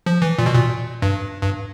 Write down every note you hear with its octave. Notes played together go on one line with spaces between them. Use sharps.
F3
E3
A#2
B2
A#2
G2
G2